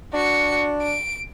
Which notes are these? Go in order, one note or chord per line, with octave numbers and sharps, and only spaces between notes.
D4 F#4 C#7
D7